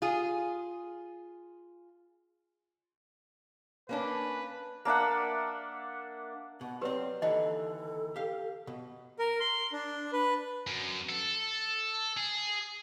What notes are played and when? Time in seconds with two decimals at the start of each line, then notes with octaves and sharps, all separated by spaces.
0.02 F4 G#4
3.89 A#3 C#4 D4 B4
4.85 A#3 D4 E5 F#5
6.61 B2 F#5
6.81 F#3 C4 G4 B4 D5
7.22 D#2 D3 E3 A4 D#5
8.16 G4 F5
8.67 B2
9.19 A#4
9.40 C6
9.72 D4
10.13 B4
10.67 F#2
11.10 A4
12.17 G#4